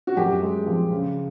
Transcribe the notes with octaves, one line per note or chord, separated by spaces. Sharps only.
F#4
F#2 G4
G#3
F3
C#3